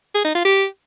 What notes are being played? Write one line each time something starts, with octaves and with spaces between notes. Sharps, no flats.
G#4
D#4
F4
G4